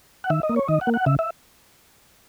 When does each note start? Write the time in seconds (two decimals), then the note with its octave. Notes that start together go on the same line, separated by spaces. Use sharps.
0.24 F#5
0.30 D#3 E5
0.43 D#5
0.49 A#3
0.56 C#5
0.68 D#3 D#5
0.81 F#5
0.87 A#3
0.94 F#5
1.06 C#3 E5
1.19 E5